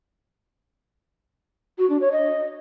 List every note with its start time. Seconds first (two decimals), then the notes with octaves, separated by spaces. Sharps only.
1.78 F#4
1.90 D4
2.01 C#5
2.12 D#5